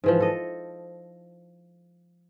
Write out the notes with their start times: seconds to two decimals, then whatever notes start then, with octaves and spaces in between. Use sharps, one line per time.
0.04 G#2 E3 F3
0.20 A4 D#5